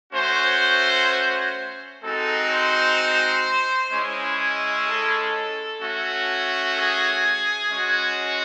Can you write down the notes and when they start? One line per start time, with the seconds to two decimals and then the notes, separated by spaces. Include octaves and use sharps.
0.13 A3 C#4 F#4 C5
2.02 G#3 C4 D#4 F#4 A4
2.50 C5
3.91 G#3 C#4 E4
4.86 A4
5.81 A3 C#4 F#4
6.76 G#4
7.71 G#3 C#4 F#4